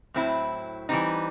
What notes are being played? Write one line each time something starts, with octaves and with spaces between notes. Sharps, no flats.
A2 F#3 C4 E4
E3 G3 C4 D#4